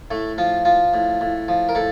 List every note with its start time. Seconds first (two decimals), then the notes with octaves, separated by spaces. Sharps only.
0.11 A2 A3
0.38 F3 F4
0.65 F3 F4
0.94 A2
1.21 A2
1.48 F3
1.69 A#4
1.75 A2 A4